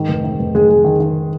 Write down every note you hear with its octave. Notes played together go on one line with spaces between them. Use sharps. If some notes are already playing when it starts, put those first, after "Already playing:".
Already playing: G#2 D#3
F1
D#3
F1
F1 G#3 G#4
G#3
D#3
D#3